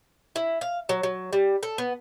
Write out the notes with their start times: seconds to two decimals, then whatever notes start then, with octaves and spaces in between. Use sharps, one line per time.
0.36 E4
0.61 F5
0.89 F#3
1.03 F#3
1.33 G3
1.63 A4
1.78 B3